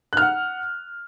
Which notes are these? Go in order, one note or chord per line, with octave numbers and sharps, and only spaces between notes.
F#5 F6 F#6